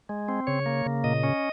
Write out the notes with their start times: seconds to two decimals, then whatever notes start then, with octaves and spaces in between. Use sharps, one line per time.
0.09 G#3
0.29 C4
0.47 C#3 C#5
0.66 A#3
0.86 C#3
1.04 A#2 D#5
1.23 C#4